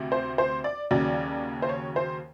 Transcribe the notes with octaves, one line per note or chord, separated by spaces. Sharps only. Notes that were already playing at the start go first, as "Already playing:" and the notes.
Already playing: D2 C3
C5
C5
D5
D#2 C#3 F#3 D5
C5
C#5
C5